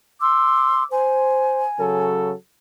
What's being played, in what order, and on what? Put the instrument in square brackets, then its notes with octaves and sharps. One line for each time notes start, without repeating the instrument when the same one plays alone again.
[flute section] C6 D6 E6
[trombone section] C5 [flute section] G#5
[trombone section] C#3 F#3 A4